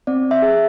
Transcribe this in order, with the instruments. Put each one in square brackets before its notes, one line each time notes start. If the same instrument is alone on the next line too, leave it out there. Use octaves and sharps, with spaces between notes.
[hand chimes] C4 D5
E5
G#4